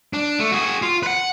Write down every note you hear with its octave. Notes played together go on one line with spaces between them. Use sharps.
D4
A3
F#4 G#4
F4
B4 F#5